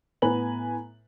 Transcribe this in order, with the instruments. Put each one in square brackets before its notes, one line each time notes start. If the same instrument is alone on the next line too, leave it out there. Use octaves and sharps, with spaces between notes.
[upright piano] A2 B3 B4 G#5 A#5 F#7